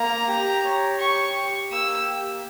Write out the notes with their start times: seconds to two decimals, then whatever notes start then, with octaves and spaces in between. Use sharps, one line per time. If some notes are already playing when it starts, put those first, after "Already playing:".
Already playing: A#3 A#5
0.28 G4
0.64 C#5
1.00 G4 C#6
1.36 G4
1.71 A#3 E6
2.07 G4